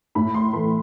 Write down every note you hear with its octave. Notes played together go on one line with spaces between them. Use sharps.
A2 B5
C6
E3 A3 B5